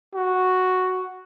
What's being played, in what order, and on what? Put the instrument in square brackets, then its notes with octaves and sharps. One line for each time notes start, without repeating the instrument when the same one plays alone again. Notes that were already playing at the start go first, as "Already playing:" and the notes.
[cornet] F#4